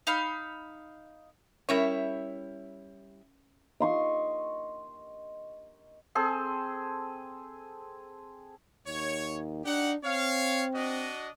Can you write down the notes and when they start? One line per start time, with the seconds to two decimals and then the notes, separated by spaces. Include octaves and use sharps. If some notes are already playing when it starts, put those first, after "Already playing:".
0.07 D#4 F5 B5
1.69 G3 C#4 E4 A#4 C#5
3.80 D#5 C6 C#6
6.15 C4 G#4 A4
8.86 D#2 C#5
9.65 D4 D#4 G4 F#5
10.04 C4 C#5 F5
10.74 D4 F#4 D#5